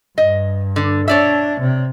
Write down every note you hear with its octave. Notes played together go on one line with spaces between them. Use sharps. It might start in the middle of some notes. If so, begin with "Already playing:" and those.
G2 D#5
D3
D4 C#5 D5 E5
C3